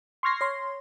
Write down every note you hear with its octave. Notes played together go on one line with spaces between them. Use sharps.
C6 C#6 F6 G#6 A#6 C7
C#5 C6